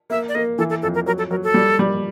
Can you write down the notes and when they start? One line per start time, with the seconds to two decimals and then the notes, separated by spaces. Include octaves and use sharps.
0.10 A#3 E5
0.28 D5
0.35 A#3 D#5
0.58 E3 A4
0.70 A4
0.82 F2 A4
0.95 A#4
1.06 F#3 A#4
1.18 A4
1.30 F#3 A#4
1.43 A4
1.54 G3
1.79 G3